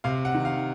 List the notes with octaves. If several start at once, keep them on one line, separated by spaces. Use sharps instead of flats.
C3 F5
F#5
D#3
F5